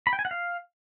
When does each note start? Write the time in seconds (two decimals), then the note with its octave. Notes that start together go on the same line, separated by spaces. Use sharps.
0.07 B5
0.13 G5
0.19 G#5
0.25 F#5
0.31 F5